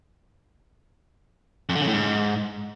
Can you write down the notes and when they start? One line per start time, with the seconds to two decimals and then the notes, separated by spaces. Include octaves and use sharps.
1.69 F2
1.75 D3
1.81 C#3
1.87 A2
1.93 G#2